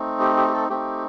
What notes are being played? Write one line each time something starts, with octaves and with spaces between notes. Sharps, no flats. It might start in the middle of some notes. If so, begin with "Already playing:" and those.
Already playing: A3 C4 D#4
G4
G4
G4
A4
A3 C4 D#4 G4